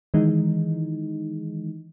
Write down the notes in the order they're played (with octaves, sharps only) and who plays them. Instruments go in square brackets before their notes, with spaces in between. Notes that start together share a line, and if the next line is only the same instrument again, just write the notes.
[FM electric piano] D#3 E3 G#3 D#4